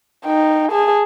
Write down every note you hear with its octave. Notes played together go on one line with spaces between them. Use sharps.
D#4 G5
G#4 A5